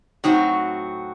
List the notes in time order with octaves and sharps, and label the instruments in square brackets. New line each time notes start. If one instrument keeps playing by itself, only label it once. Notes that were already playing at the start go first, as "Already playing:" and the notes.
[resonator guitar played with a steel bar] A2 F#3 C4 F#4 [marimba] D#4